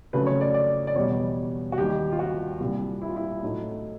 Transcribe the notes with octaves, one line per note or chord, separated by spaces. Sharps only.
F2 C#3 F#3 A3 B4
C#5
D5
D5
D5
E2 B2 G3 C#5
F#4
D#2 D#3 G3 G4
F4
F#4
C2 A#2 G3
E4
F4
E4
A2 F#3 A3 D#4